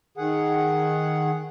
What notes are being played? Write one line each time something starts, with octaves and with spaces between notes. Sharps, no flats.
D#3 G#4 F#5